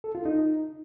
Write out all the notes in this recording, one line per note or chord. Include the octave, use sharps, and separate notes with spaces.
A4
F4
D#4